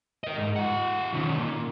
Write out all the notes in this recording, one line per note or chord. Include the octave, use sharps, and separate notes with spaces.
A#4 D#5
G#2
F4 F#5
D#3 C#4
A#2